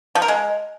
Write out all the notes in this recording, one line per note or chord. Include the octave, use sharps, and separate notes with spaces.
F3
A#4
G#3